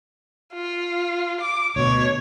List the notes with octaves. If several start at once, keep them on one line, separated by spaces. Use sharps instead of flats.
F4
D6
D2 B2 C#5